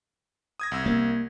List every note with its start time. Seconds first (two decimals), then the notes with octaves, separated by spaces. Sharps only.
0.60 D#6 G#6 A#6
0.72 C2 E6
0.86 A#3